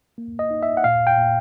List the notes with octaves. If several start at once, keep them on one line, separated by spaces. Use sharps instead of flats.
A#3
D#5
D#4
E5
F#5
A#2 F5
G5
A#2